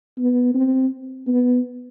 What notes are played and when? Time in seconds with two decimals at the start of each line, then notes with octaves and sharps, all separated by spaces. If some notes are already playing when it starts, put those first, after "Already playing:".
0.18 B3
0.54 C4
1.27 B3